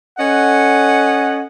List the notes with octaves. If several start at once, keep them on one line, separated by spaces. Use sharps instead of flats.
C#4 A4 D#5 F#5